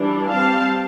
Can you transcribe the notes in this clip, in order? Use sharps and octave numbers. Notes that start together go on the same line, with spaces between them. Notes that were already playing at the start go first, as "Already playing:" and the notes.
Already playing: E3 G3 D4
G3 C4 F5 A5